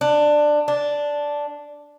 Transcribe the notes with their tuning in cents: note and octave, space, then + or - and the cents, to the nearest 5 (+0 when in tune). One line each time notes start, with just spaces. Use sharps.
D4 +15
D4 -5